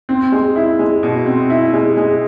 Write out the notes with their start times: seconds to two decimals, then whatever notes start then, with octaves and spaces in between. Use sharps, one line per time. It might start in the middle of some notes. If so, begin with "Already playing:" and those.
0.09 C4
0.32 G#3
0.56 E4
0.79 G#3
1.03 B2
1.26 C4
1.50 E4
1.73 G#3
1.97 G#3